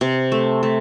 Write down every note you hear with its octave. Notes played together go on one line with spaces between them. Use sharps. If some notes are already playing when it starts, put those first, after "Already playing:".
C3
A3
A3